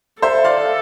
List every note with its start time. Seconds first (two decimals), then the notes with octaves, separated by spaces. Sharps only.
0.22 A4 C5 E5
0.44 D5 F5